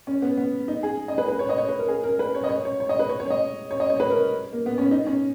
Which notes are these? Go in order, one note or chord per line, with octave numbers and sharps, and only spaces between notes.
C#4
B3
B3
D#4
G#4
D#5
B4
B4
C#5
D#5
C#5
B4
A#4
G#4
A#4
B4
C#5
D#5
C#5
C#5
C#5
D#5
B4
C#5
C#5
D#5
C#5
D#5
C#5
B4
A#4
A#3
B3
C#4
D#4
C#4